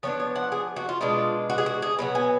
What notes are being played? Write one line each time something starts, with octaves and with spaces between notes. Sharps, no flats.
F3 B3 D4 C#5
C#5
F#5
G#4
F#4
F4
B2 G#3 D4 F4
F#4
G#4
F#4
G#4
B2 F#3 B3
G#5